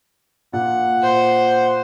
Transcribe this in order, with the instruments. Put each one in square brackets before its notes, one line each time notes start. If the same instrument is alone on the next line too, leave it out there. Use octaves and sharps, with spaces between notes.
[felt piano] A#2 [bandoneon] F#5
[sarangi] C5